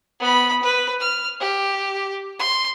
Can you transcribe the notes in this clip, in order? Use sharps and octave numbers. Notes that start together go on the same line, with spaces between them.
B3 B5
B4
F6
G4
C6